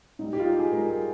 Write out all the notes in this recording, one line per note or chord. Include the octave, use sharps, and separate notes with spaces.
G#2 G3 D#4
G4
F4
D#4
G#4
G#2 G3 A#4
G#4